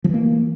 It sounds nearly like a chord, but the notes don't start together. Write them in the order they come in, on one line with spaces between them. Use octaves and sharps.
F3 E3 A#3